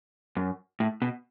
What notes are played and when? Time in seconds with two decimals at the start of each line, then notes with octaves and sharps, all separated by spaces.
0.37 F#2
0.80 A2
1.02 B2